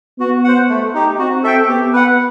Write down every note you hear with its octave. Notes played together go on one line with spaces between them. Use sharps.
B3 F#4
C5 F#5
A3
D#4 G4
C4 F#4
A4 E5 G5
B3 G4
B4 F#5